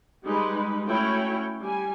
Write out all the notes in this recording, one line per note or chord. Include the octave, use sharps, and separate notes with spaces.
G3 G#3 D#4 B4
A3 C#4 E4 F#4 C#5 G5
G3 G#5